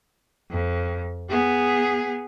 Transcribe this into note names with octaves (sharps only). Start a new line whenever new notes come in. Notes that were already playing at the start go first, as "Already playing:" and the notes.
F2
B3 G#4